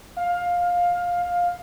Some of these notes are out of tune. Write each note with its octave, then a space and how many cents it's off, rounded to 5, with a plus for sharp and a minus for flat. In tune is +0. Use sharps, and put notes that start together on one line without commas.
F5 +15